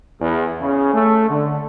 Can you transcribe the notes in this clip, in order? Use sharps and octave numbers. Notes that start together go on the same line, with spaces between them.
E2
C#3
A3
D3